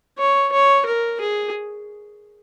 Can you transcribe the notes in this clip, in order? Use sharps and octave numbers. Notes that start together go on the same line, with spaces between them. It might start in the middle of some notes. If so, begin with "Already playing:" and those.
C#5
C#5
A#4
G#4